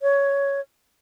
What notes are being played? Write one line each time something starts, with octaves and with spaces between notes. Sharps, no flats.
C#5